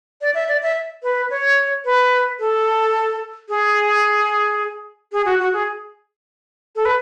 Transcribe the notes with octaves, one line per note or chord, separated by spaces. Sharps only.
D5
E5
D5
E5
B4
C#5
B4
A4
G#4
G#4
F#4
F#4
G#4
A4
B4